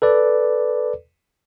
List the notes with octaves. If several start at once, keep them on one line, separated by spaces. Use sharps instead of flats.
A4 B4 D5